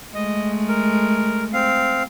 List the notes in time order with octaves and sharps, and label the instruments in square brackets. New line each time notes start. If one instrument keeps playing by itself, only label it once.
[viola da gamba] G#3 A3 [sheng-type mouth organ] D#5
[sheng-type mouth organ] A#4
C4 F5